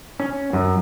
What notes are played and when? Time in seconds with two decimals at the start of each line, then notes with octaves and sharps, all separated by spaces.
0.20 C#4
0.53 F#2